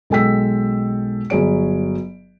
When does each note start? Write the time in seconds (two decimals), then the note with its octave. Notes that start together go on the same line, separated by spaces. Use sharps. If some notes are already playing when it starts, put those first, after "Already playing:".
0.10 B1 G#3 A4 G5 E6 B6
1.30 G1 F#3 G#4 C#5 D7